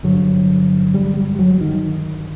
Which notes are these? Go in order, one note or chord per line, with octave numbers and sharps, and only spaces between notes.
G1 G2 D3 F#3
G3
G3
F#3
D#3